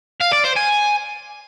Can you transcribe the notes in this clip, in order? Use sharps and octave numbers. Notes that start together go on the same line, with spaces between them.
F5
D5
C5
G#5